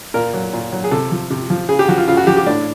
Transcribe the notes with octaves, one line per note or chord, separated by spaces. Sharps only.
A#2 A#4
F#3
A#2
F#3
G#4
C3 A4
F3
C3
F3
C#3 G#4
G4
F3 F#4
F4
C#3 F4
F#4
F3 G4
G4
A2 D4